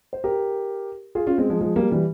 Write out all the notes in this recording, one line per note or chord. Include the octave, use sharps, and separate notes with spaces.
C5
G4 A#4
F4 G#4
C#4 F4
G#3 C4
F3 G#3
F3 G#3
G3 A#3
E3 G3